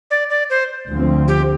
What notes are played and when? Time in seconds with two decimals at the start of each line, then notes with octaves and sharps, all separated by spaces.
0.11 D5
0.30 D5
0.50 C5
0.89 D2 D3 F3 C4
1.28 G4